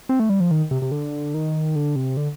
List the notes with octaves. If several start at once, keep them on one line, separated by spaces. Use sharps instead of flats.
C4
A3
G3
F3
D#3
C3
C3
D3
D#3
D3
C3
D3